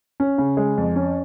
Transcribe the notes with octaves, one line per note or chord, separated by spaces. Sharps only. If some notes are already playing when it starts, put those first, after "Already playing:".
C#4
C#3
G#3
F2
C#4